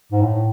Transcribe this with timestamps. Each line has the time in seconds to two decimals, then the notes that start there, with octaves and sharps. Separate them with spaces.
0.12 G#2
0.22 A2